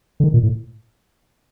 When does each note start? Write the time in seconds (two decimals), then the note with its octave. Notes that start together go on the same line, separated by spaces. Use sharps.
0.20 D3
0.24 D#3
0.34 A#2
0.43 A2